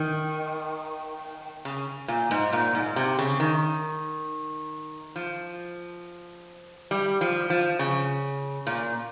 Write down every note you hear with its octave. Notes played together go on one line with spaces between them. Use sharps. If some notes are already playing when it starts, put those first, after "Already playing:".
Already playing: D#3
C#3
A#2
G#2
A#2
G#2
C3
C#3
D#3
F3
G3
F3
F3
C#3
A#2